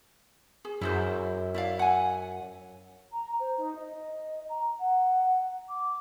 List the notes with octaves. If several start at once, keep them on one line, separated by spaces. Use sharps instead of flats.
G#4
F#2 E4 G#4 C5
E4 D5 F5
F#5 G#5
A#5
C5
D#4
D#5
A#5
F#5
D6